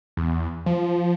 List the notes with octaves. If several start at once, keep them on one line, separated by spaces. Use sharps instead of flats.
E2
F3